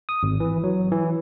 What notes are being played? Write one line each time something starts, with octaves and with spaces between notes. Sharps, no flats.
D#6
G#1
E3
F#3
E3